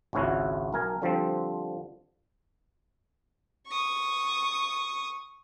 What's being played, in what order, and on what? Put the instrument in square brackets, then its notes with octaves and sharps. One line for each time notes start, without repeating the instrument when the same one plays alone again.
[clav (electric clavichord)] G#1 C#2 G#2 C#4 E4 F#4
B1 A#4 G#5
D3 F3 G3 C4
[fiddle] C#6 D#6